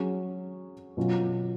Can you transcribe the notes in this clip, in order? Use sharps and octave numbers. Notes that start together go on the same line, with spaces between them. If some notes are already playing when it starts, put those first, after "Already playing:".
Already playing: F#3 C#4 G#4
B2 F#3 C#4 F4